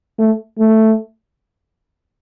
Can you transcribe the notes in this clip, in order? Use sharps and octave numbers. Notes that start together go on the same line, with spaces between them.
A3
A3